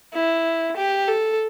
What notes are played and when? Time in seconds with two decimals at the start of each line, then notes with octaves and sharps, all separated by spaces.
0.14 E4
0.76 G4
1.08 A4